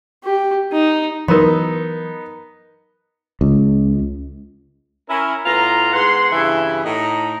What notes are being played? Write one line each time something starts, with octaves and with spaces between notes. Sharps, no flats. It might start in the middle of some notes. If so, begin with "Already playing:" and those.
G4
D#4
E3 F#3 B3 D#4 A#4 A#5 C6
C#2
C#4 E4 A#4
A2 B3 F4 A#5
G#2 B3 F#5 C6
G2 C#3 E3 E4
A2 D#4 A#5